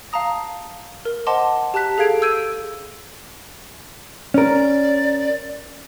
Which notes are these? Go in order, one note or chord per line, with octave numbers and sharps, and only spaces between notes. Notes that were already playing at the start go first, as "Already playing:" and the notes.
F5 A5 A#5 D#6 A#6
A#4
C5 D#5 F#5 A5 C6 D6
G4 A5 A#5 F#6 B6
G#4 A4 F5 G#6 D7 F7
E6 G6 G#6 D7 D#7
C#4 A#4 D5